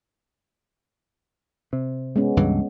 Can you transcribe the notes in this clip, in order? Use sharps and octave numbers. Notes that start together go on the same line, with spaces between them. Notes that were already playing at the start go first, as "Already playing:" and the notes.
C3
G#3 B3 C#4
C#2 G2 E3